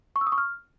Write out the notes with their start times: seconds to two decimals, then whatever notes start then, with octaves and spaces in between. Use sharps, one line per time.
0.16 C#6
0.21 E6
0.27 D#6
0.32 C#6
0.38 F6